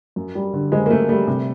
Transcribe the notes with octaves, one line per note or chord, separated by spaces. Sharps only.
F#2
G3
D3
F#1 G#3
A#3
F#2 A3
G3 A3
C3